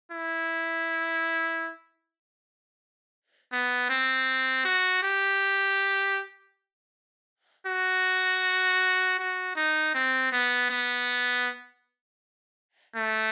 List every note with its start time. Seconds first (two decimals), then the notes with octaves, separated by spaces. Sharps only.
0.12 E4
3.53 B3
3.90 C4
4.65 F#4
5.03 G4
7.67 F#4
9.19 F#4
9.56 D#4
9.95 C4
10.32 B3
10.70 B3
12.96 A3